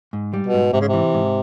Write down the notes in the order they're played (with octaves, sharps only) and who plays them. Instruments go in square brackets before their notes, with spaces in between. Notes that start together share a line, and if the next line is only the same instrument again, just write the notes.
[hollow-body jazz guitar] G#2
G3
[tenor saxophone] B2
[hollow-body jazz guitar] G#2
[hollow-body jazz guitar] G#2 [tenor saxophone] C3
[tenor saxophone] C#3
C3
[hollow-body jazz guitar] E3
G#2